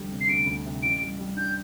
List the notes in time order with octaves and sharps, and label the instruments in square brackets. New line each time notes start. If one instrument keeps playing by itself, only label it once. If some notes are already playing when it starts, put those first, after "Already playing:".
Already playing: [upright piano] F1 D2 G3
C3
[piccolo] C7
[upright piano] D2 [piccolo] D7
[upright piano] D2
C3
[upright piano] A1 [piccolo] D7
[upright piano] G3
G3
[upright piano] D4 [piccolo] G6